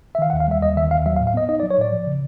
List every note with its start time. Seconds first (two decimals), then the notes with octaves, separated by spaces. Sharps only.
0.15 E5
0.19 D#3 F5
0.30 F#5
0.33 D#2
0.40 F5
0.48 G3 E5
0.62 D#2 D#5
0.77 D#3 E5
0.91 D#2 F5
1.06 F#3 E5
1.16 F5
1.20 A2
1.27 F5
1.34 B3 D#5
1.49 D#4 D#5
1.60 D5
1.63 F#3
1.71 C#5
1.78 A2 D5
1.92 F3
2.07 C#3